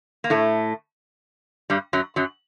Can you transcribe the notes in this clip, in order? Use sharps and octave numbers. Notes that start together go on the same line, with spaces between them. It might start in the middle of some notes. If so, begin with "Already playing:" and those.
A#3
A2 A3
G2 G3
F#2 F#3
F#2 F#3